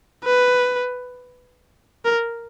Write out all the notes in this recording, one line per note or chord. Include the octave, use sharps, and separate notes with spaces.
B4
A#4